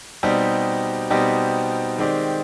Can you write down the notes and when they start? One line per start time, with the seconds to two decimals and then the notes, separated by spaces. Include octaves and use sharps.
0.23 B2 G3 C4 D#4 G4
1.10 B2 G3 C4 D#4 G4
1.98 D#3 G#3 C4 G4 D5